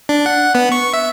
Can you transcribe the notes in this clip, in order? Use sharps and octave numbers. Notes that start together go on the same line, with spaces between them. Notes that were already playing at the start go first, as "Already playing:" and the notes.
D4
F#5
B3
C#6
E5